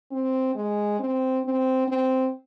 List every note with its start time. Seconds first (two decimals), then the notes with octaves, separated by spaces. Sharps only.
0.11 C4
0.55 G#3
0.99 C4
1.44 C4
1.88 C4